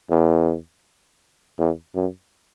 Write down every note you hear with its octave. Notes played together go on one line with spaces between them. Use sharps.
E2
E2
F#2